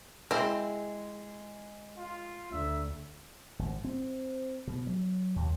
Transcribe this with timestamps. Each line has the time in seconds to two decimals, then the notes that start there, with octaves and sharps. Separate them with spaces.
0.31 G#3 C4 E4
1.97 F4
2.52 D2 E5
3.59 G#1
3.84 C4
4.67 B2
4.87 F#3
5.36 D#2